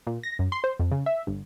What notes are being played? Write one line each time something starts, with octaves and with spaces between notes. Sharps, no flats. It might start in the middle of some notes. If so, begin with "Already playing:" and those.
A#2
A#6
F#2
C6
C5
F2
C#3
E5
G1